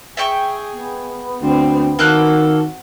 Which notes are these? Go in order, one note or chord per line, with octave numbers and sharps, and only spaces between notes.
G#4 E5 G5 C#6
B3
D2 C4
D#3 A#3 F#4 A4 F#6